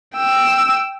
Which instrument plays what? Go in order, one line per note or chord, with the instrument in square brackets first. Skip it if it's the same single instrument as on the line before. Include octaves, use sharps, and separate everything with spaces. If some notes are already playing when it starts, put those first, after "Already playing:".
[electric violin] G5 E6